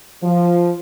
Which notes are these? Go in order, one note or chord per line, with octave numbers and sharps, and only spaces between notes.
F3